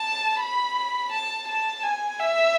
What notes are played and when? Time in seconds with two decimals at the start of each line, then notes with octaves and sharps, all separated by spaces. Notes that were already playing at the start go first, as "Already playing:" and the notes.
Already playing: A5
0.40 B5
1.12 A5
1.48 A5
1.83 G#5
2.19 E5